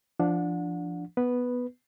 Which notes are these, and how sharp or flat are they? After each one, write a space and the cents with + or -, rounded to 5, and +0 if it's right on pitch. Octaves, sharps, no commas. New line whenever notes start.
F3 -15 D4 +0 F#5 -35
B3 +0 B4 +0